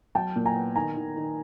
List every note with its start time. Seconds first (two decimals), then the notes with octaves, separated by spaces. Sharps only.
0.15 F#3 G5 A5
0.36 A#2
0.46 G#5 A#5
0.56 B3
0.76 D#3 G#5 A#5
0.96 D#3
1.17 D#3